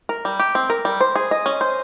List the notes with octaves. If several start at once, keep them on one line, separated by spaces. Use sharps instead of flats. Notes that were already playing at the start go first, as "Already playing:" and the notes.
A#4
G3
G4
C4
A#4
G3
C5
G#4
D#5
C#4
C5